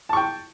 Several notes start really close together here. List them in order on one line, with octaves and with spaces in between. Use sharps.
A5 C#6 G5